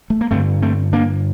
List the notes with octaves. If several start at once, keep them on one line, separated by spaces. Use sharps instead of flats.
A3
A#3
G2 D3 A3 C4
A3 C4
A#3 D4